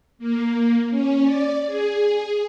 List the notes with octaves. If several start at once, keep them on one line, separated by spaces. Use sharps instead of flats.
A#3
C#4
D5
G#4